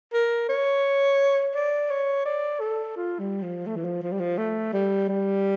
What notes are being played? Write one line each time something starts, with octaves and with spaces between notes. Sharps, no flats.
A#4
C#5
D5
C#5
D5
A4
F4
G3
F3
A3
E3
F3
F3
G3
F3
A3
G3
G3